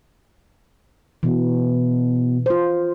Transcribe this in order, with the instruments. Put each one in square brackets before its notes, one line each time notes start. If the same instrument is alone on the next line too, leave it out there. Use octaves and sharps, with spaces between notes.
[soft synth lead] B2 [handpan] E3
[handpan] F4 C5